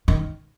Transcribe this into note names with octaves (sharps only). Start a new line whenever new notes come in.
D#3